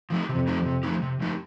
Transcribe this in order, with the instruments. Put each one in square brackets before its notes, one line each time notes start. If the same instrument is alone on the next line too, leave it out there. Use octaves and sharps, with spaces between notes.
[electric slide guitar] F3 A3 D#4 G4
[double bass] F2 [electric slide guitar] C3
[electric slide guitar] F3 A3 D#4 G4
C3
F3 A3 D#4 G4
C3
F3 A3 D#4 G4